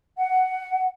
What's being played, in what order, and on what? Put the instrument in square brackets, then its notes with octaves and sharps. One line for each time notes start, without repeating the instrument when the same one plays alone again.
[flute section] F#5